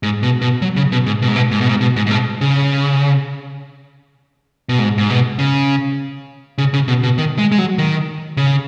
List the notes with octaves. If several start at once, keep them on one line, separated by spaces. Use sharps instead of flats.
G#2
B2
B2
F#3
C#3
B2
G#2
B2
G#2
B2
G#2
B2
G#2
B2
G#2
G#2
B2
C#3
B2
G#2
G#2
B2
C#3
C#3
C#3
B2
B2
D#3
G#3
G#3
F#3
D#3
C#3